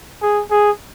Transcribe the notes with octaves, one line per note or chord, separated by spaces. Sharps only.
G#4
G#4